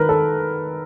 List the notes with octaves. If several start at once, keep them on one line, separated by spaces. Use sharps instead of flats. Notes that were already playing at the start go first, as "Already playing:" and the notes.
Already playing: D#3 A#4 B4
A4